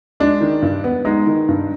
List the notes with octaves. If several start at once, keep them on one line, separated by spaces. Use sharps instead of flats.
G#3 D4
D#3
G2
B3
G#3 D#4
D#3
G2